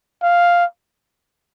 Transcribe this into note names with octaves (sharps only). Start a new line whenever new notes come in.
F5